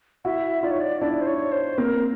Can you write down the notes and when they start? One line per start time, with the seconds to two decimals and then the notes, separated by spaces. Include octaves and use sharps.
0.25 E4 F#4 E5
0.63 D#4 F4 D5
0.71 C#5
0.80 D5
1.01 D4 E4 D5
1.21 C5
1.27 C#5
1.52 C5
1.78 A#3 C4 A#4